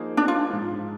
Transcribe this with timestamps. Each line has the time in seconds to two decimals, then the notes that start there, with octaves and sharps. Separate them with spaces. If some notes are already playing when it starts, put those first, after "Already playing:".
Already playing: F3 A#3 D#4 G#4 C5
0.17 D4
0.28 F4
0.49 G#2 F3 G#3